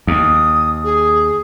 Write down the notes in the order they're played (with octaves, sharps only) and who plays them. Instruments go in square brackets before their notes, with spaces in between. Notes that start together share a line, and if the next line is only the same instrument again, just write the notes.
[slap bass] D#2 [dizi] D#6
[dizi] G#4